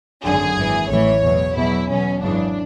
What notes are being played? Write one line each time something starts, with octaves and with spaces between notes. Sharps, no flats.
G#1 F#2 D3 F#3 G#4
G#1 F#2 E3
A1 A2 E3 C#5
E2 B2 F#3
E2 B2 F#3 E4
E2 B2 F#3 C#4
G#1 F#2 C#3 E3 D4